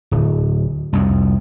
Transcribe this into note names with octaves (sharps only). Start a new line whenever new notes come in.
D1
C2 F2